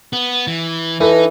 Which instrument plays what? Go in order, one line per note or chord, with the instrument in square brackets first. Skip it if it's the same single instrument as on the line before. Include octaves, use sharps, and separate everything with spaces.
[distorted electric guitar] B3
E3
[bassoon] E3 [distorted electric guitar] D#4 [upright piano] A4 B4